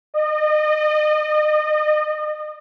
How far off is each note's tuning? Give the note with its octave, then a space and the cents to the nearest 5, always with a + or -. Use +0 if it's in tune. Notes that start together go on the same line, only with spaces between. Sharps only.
D#5 -35